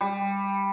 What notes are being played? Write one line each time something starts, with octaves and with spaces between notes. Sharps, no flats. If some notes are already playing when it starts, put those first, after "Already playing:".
G3